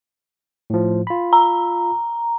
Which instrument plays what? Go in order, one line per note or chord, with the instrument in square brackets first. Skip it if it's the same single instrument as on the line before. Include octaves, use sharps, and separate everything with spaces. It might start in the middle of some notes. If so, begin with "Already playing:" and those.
[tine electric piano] A2 F3
F4 B5
[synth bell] A#5